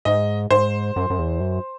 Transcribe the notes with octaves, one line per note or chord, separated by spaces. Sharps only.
G#2 D#5
G#2 C5
F#2
F#2
E2
F#2